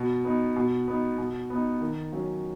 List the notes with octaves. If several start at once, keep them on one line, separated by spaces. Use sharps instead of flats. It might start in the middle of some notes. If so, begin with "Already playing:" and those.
Already playing: B2
B3 D#4
B2
B3 D#4
B2
B3 D#4
D#3
F#3 C#4